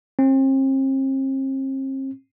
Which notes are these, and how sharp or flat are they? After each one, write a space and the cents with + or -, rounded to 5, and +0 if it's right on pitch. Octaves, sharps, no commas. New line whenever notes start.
C4 +40